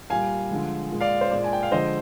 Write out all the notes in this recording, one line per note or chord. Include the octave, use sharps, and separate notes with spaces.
A#2 G3 F5 G#5
D3 F3 G#3
A#2 G#3
D5 F5
C5
A#2 G#3 D5
G#5
G5
F5
D3 F3 G#3 C5 D#5